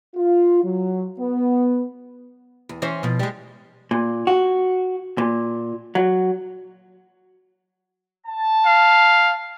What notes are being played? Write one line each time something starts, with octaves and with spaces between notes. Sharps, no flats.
F4
F#3
B3
E2
E3 C#4 C5
B2 F3
G3 G#3
A#2
F#4
A#2
F#3
A5
F5